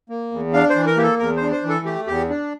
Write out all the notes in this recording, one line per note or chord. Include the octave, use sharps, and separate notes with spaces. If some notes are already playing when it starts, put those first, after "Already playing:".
A#3
E2
D4 F5
C5
E3
A#4
A#3 G4
A4
E2 A#4
C5
D4
C5
E3
A4
A3 G4
E2 G4
D4